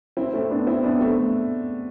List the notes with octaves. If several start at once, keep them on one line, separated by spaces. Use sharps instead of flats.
C4 E4
A3 C4
B3 D4
C4 E4
B3 D4
A3 C4